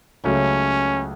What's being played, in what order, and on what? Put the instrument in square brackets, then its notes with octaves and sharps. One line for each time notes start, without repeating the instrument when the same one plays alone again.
[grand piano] C#2 C#3 F#3 A3 [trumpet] C#4